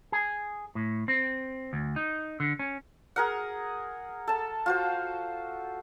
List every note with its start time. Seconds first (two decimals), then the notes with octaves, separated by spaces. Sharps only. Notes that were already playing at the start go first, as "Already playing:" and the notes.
0.12 G#4
0.75 A2
1.08 C4
1.73 D2
1.96 D#4
2.40 D3
2.59 C#4
3.16 G#4 A#4 F#5
4.28 A4 A5
4.66 F4 F#4 C5